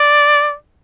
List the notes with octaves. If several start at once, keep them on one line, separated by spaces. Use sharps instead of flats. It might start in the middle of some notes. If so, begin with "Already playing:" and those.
Already playing: D5